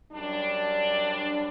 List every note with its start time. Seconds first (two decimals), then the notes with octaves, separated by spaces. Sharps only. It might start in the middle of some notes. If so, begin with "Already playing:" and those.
0.12 F#2 G3 D4